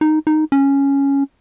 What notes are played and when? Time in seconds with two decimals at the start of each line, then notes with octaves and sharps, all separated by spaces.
0.01 D#4
0.27 D#4
0.52 C#4